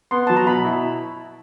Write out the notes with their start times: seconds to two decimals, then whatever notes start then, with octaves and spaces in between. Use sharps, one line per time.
0.11 B3 C6
0.27 F#3 A5
0.37 A#5
0.46 B2 B5
0.65 E4